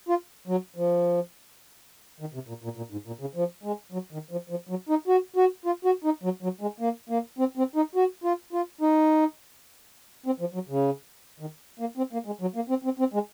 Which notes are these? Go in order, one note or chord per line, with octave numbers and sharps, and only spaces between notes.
F4
F#3
F3
D#3
C3
A#2
A#2
A#2
G#2
A#2
C#3
F3
G#3
F#3
D#3
F3
F3
F#3
D#4
F#4
F#4
F4
F#4
D#4
F#3
F#3
G#3
A#3
A#3
C4
C4
D#4
F#4
F4
F4
D#4
C4
F3
F#3
C#3
D#3
A#3
C4
A#3
G#3
F#3
A#3
C4
C4
C4
G#3